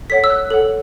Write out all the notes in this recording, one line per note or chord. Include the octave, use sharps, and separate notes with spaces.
A4 C#5 F#5 B6
E6
F#6
A4 C#5 F#5